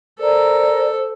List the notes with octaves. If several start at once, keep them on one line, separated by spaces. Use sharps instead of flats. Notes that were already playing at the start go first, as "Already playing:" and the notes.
A4 A#4 C5 D5